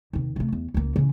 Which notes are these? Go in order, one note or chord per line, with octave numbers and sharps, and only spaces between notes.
D#2 C3
C3 A3
E2
C#2 A#3
C#3 E3